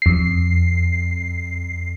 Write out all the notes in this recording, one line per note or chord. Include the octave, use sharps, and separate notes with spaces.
F2 C7